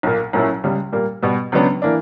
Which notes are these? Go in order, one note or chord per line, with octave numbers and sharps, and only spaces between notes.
B1 A#2 A#3
B1 A#2 F#3 C#4 E4
C#2 C#3 G3
A#2 G3 A#3
B2 G3 B3
C#2 C#3 F#3 B3 D4
E3 A#3 D4